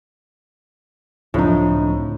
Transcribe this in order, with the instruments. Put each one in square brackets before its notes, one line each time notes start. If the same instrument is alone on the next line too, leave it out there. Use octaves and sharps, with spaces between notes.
[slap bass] C#2 D3 C4 [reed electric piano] F#2 F3 D4 [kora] A2 D#4